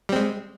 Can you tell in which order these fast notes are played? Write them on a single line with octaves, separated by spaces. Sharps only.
G3 C4 G#3